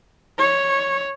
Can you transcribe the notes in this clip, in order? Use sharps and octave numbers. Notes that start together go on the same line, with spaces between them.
C#5